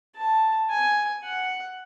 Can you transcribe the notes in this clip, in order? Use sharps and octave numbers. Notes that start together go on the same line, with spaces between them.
A5
G#5
F#5